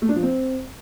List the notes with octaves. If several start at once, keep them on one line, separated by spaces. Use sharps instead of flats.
A3
D4
F3
C4